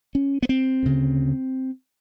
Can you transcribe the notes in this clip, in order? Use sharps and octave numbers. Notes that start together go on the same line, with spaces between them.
C#4
B3
C4
D2 C#3